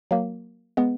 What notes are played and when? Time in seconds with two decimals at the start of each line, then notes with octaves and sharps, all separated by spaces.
0.11 F#3 A#3
0.77 G#3 B3